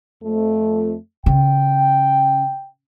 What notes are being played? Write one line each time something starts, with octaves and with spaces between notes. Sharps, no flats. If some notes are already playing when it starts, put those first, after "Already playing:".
F2 A3
C#3 G5